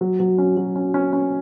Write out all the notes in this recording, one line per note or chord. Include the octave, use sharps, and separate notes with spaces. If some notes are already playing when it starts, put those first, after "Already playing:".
F#3
F#3
C#4
F#3
C#4
C#4
C#4